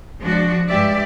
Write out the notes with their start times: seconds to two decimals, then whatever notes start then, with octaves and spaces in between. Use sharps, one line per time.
0.20 F3 G#3 D4 F#4
0.67 G2 G#3 G4 D5 E5